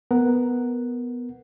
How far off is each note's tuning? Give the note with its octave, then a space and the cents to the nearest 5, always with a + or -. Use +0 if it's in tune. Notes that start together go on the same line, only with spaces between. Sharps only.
B3 +0 A#4 +0 F#5 +0